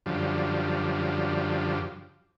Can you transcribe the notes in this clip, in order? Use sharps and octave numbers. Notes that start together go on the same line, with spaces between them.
F#2 D3 F3 G3